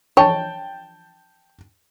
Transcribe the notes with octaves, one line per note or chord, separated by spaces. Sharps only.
C#5 G5 A5